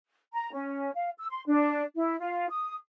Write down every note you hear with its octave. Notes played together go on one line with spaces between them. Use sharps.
A#5
C#4
F5
E6
C6
D4
E4
F4
D#6